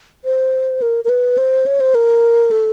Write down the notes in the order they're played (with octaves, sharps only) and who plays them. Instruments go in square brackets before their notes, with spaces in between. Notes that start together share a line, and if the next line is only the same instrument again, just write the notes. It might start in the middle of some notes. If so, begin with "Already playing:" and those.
[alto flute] C5
A#4
A#4
B4
C5
C#5
C5
A#4
A4